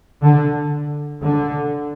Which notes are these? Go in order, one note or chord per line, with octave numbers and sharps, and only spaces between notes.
D3
D3